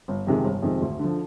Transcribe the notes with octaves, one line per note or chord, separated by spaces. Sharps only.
G1
F2 C3 D#3 G#3
G1
F2 C3 D#3 G#3
D2
D3
F3